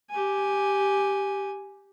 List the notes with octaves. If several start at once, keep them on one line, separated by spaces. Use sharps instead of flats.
G4 G#5